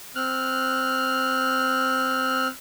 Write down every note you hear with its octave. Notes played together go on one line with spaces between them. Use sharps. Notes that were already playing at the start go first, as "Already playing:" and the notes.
C4 F6 F#6